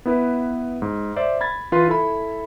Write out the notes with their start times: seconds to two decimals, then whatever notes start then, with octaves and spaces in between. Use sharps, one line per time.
0.05 B3 E4 B4
0.82 G#2
1.16 C5 D5 E5
1.41 B5 G#6 A6
1.72 E3 F4 B4 C6
1.88 E4 A4 B5